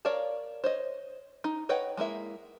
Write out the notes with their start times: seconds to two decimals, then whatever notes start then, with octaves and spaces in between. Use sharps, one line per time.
0.05 A#4 C#5 D5 F5 A5
0.64 C5 C#5 D#5
1.44 D#4
1.69 B4 C#5 D#5 F#5 G5
1.97 G#3 A#3 E4 E5